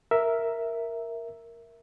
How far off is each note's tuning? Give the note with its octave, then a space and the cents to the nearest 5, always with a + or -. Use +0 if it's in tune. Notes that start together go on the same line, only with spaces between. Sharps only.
A#4 +0 E5 +0